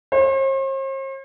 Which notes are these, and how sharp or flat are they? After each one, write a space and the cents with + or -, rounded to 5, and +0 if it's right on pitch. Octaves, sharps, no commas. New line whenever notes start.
C5 +45